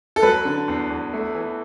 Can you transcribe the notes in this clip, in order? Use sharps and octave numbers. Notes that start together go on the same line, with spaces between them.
A4
F#3 B4
D3
E2
E2
A3
E3